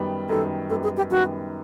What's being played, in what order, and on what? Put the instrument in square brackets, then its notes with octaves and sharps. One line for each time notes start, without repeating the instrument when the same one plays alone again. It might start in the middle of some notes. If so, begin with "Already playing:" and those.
Already playing: [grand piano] F#2 D#3 G3 B3
[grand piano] F#2 D#3 G3 B3 [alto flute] A4
[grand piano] F#2 D#3 G3 B3 [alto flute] A4
[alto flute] G#4
G4
[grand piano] F#2 D#3 G3 B3 [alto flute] F#4